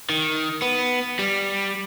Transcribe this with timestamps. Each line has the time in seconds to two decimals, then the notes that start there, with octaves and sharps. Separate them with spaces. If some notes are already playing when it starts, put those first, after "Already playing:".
0.09 D#3
0.62 B3
1.19 G3